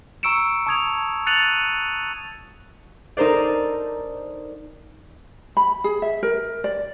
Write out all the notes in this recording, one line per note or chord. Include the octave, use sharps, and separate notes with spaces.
A#5 C#6 E6 C#7 D7 E7
A5 C#6 D#6 G#6 D7 F7
F#6 A6 C#7 D#7 F7 F#7
D#4 A4 A#4 C5 D5
B5
G#4
E5
A#4
D5